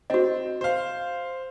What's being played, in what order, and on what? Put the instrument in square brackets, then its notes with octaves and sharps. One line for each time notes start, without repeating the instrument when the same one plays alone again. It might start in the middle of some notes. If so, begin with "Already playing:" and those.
[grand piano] C4 [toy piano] F#4 D#5
[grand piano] C5 F5